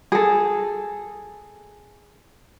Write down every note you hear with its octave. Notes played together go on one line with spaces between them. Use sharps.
G#4 A4